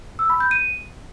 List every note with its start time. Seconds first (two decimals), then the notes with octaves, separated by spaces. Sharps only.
0.19 E6
0.30 B5
0.40 G6
0.51 D#7